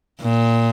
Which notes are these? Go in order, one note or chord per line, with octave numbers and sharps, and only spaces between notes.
A#2